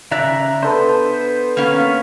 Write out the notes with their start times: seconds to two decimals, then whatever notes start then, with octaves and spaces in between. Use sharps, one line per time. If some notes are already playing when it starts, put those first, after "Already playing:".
0.11 C#3 D5 E5 A#5 F#6
0.63 B3 D4 A4 B4 C5
1.57 A#3 B3 C#4 F5